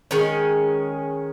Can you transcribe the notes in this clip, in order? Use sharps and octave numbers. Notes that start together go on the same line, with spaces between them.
D#3 G#3 C#4